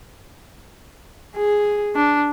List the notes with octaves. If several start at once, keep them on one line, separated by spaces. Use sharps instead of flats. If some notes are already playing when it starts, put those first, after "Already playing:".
G#4
D4